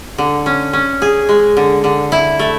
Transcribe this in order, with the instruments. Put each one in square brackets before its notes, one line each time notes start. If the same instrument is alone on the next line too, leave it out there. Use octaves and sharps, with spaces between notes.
[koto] D3
C#4
C#4
G#4
G#3
D3
D3
E4
A3